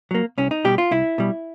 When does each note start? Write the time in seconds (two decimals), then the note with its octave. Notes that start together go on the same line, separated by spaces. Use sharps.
0.11 F#3 A#3
0.38 C2 C#4
0.51 D#4
0.65 B2 G3 G4
0.78 F4
0.91 C2 E4
1.18 B2 G3